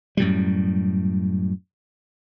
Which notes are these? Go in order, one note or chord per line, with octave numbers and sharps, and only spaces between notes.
F#2 A2 G3